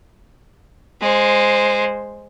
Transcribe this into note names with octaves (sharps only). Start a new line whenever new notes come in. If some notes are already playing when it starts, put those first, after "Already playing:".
G#3 C5